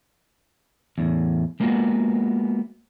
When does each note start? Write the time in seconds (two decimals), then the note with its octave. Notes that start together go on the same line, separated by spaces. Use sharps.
0.98 E2 A2
1.60 G#3 A#3 B3 F4 F#4